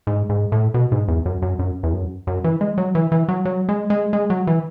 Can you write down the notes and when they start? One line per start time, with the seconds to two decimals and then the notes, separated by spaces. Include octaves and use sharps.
0.07 G#2
0.29 G#2
0.52 A2
0.74 B2
0.92 G#2
1.08 E2
1.26 F#2
1.42 F#2
1.59 F#2
1.83 E2
1.93 F#2
2.27 F#2
2.44 E3
2.61 G#3
2.78 F#3
2.95 E3
3.12 E3
3.28 F#3
3.45 F#3
3.69 G#3
3.90 G#3
4.13 G#3
4.30 F#3
4.47 E3